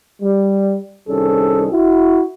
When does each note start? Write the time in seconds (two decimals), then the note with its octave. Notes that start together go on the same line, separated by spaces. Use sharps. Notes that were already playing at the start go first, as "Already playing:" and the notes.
0.22 G3
1.09 C2 D#3 G3 C#4 G#4 A4
1.72 E4 F#4